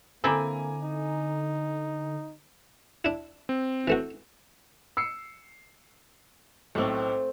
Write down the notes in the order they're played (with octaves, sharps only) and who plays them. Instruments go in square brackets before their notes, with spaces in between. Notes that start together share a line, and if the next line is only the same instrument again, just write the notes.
[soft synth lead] D3 [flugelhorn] A#3 [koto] C4 E4 A4 [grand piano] G#5 A#5 D6
[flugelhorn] D#4
[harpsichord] D4 E4
[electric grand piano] C4
[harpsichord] E3 A3 F#4
[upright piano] E6 C7 C#7
[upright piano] B1 A2 [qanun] A3 C4